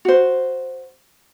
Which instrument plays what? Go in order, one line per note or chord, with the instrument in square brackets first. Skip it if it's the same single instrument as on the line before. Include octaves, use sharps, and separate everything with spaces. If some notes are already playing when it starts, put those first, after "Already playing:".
[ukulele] F#4 C5